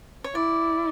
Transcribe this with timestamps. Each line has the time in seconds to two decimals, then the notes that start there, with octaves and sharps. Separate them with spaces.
0.24 C#5
0.35 E4 D5